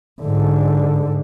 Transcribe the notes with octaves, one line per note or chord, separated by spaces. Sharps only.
G#2 D3